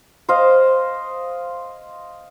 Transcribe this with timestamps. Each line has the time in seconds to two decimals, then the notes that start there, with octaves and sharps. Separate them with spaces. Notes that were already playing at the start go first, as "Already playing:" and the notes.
0.29 C5 D#5 F5